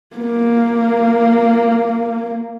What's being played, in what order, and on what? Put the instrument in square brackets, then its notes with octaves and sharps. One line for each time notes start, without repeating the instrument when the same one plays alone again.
[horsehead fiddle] A#3